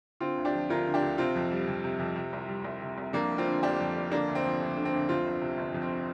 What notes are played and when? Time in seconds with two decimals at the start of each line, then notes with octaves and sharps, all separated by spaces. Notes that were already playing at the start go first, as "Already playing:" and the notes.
0.20 D3 C4 F4
0.38 D2
0.45 D4 G4
0.54 F3
0.70 D2 F4 A#4
0.86 D3
0.94 D4 G4
1.02 D2
1.18 C3 C4 F4
1.35 F2
1.51 G3
1.67 F2
1.84 C3
1.99 F2
2.16 C3
2.33 C2
2.48 G3
2.64 C2
2.82 C3
2.98 C2
3.13 F2 A#3 D4
3.31 F1
3.38 C4 F4
3.46 D3
3.62 F1 D4 G4
3.79 F2
3.95 F1
4.11 D3 A#3 D4
4.28 D2
4.35 C4
4.44 F3
4.61 D2
4.77 D3
4.85 C4
4.93 D2
5.09 F2 C4 F4
5.26 G1
5.41 C3
5.57 G1
5.74 F2
5.82 C4